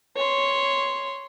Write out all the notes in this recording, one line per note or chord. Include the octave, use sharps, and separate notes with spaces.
C#5 C6